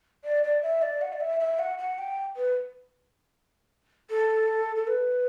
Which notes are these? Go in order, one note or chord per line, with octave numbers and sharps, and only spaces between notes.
D5
D5
E5
D5
F#5
D5
E5
E5
F#5
F#5
G5
B4
A4
A4
B4